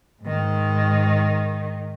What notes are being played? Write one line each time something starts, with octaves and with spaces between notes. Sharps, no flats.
G#2 D#3